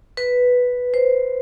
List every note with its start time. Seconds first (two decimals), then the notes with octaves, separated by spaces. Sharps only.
0.17 B4
0.94 C5